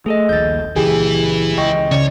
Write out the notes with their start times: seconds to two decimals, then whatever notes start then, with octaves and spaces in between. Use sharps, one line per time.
0.06 A3 G#4 A4 D#5
0.29 D#1 A#1 D#2 G6 A6
0.76 C#2 A#2 E3 G4 G#4
1.58 C#2 D#5 G5 C#6
1.92 C#3 C#5 D5